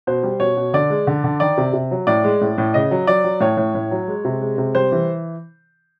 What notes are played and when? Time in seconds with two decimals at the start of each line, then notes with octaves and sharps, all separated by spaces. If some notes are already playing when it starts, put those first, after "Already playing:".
0.07 B2 C5
0.23 G3
0.40 B2 C#5
0.57 B2
0.74 D3 D5
0.90 G#3
1.07 D3
1.24 D3
1.40 D#3 D5
1.58 C3
1.73 C3
1.91 F#3
2.07 A2 D5
2.24 G#3
2.41 A2
2.58 A2
2.74 C#3 D#5
2.91 F#3
3.07 F#3 D5
3.24 F#3
3.40 A2 C#5
3.57 A2
3.75 A2
3.91 F#3
4.08 G#3
4.25 C3
4.41 G#3
4.58 C3
4.75 G3 C5
4.92 E3